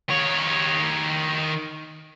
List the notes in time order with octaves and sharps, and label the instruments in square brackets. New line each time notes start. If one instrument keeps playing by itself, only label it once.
[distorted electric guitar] D#3 C#5